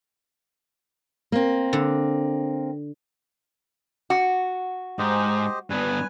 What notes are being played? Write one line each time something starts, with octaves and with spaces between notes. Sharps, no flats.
A#3 C4
D3
F#4
G#2 G4 C5 D#5
G2 B3 B4 G#5